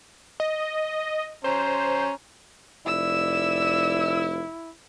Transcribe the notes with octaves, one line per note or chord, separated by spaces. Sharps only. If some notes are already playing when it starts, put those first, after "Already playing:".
D#5
C#4 C5 A#5
F1 E4 D5 E6